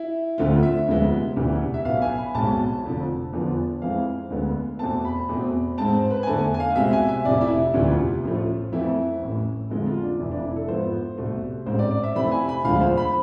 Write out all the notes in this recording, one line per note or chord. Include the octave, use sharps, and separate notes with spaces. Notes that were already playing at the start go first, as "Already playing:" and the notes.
Already playing: E4
D2 D3 A3 C4 F4
E5
D2 C3 F3 G#3 B3
E1 D2 C3 E3
E5
B1 B2 B3 F5
G#5
B5
B1 B2 G#3 C4 A5
A5
F1 F2 D3 F3
E2 D3 F3 B3
F2 E3 G#3 C4 F5
D2 D3 G#3 B3
E2 B2 A3 C4 A5
B5
E2 B2 A3 C4
G#2 G#3 C4 A5
C5
B4
G#5
E2 D3 A3 A5
G#5
F5
C2 B2 G#3 C4 E5
G#5
E5
F1 F2 C3 D5
E4
E4
E1 D2 C3 E3 F4
A1 A2 F3 A3
F2 E3 A3 C4 E4
A1 A2 E3
F2 D3 G#3 B3 F4
F4
D4
F1 F2 E3 E4
D4
E4
A4
G#2 F3 B3 C5
C2 B2 A3
A1 G#2 G#3 C4 C5
D5
D5
E5
F2 C3 E3 A3 C4 B5
G#5
B5
E1 D2 D3 F3 G#3 F5
C5
B5